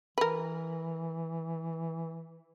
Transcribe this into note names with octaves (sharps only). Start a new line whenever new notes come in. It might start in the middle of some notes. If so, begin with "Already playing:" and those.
E3 A#4 B4